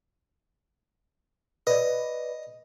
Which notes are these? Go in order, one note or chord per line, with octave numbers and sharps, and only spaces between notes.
B4 D5 D#5